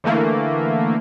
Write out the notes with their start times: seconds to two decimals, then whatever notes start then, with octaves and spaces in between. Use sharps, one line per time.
0.04 D3 E3 A3 A#3